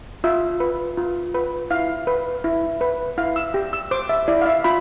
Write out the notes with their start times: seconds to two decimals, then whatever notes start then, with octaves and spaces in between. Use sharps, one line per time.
0.24 F4 E5
0.60 B4
0.97 F4
1.34 B4
1.71 E4 F5
2.07 B4
2.44 E4
2.81 B4
3.18 E4 F5
3.36 E6
3.54 G4
3.73 E6
3.91 C5 D6
4.09 E5
4.28 E4 D5
4.42 F5
4.46 E5
4.64 F4 B5